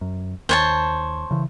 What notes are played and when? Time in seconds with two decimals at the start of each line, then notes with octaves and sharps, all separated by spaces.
0.01 F#2
0.49 D#2 C5 C#5 A5
1.31 C#3 E3